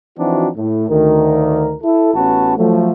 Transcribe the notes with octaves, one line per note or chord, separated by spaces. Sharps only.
E3 F3 C4 D4 D#4 F#4
A2
D2 D#3 A#4
E4 A4
A1 B3 C#4 F#4 B4 A5
F3 F#3 A3